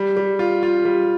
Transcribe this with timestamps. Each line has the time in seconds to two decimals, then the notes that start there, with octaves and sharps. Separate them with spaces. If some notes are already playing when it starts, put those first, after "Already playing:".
Already playing: G3
0.17 G3
0.39 F4
0.63 F4
0.85 G3